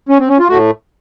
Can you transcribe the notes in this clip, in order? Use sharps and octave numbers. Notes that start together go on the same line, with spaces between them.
C#4
C4
C#4
F4
A2 A3 F#4